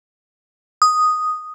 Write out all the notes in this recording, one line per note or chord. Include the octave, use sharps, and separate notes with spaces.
D#6